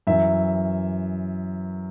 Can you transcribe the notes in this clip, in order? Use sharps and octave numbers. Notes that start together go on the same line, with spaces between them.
F#2 E3 E5